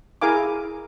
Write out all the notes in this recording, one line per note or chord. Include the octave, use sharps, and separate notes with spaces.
E4 G#4 A#4 F5 G#5 D6